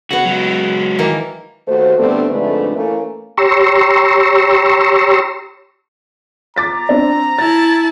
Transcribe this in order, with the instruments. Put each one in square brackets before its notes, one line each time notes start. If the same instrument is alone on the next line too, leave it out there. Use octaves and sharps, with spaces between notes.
[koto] C#3 B3 [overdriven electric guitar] F#4
[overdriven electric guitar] F#3 G#3
[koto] D#3 E3 A#3
[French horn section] D#2 A3 F#4 C5
G2 D3 A3 B3 C4 D4
F2 G#2 D3 A3 D4 B4
E3 A3 A#3 C#4
[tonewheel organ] G4 C#5 A#5 C6 C#6 E6
[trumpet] A#5 [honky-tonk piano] D6 A6 B6
[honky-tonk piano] C4 D4
[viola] E4 A5 [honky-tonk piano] A6